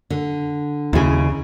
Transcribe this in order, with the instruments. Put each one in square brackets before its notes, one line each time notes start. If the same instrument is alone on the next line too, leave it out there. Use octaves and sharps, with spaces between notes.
[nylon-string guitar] D3
[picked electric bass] D#2 C#3 [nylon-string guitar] E4 G#4